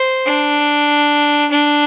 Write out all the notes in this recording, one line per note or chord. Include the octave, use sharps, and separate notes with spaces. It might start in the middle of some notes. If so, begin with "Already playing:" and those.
Already playing: C5
D4
D4